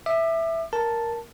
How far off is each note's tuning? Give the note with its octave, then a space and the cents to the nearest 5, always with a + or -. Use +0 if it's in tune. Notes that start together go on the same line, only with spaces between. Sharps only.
E5 +0 D6 +35
A#4 +0 A5 +0